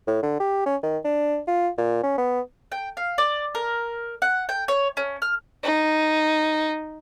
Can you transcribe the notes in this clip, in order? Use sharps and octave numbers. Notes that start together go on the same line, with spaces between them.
A2
D3
G4
C#4
D#3
D4
F4
A#2
C#4
B3
G5
F5
D5
A#4
F#5
G5
C#5
C#4
F6
D#4